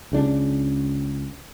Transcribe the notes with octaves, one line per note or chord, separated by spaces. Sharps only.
C#2 C#3 D4